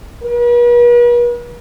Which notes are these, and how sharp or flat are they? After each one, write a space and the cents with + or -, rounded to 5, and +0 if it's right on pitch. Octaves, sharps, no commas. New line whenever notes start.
B4 -45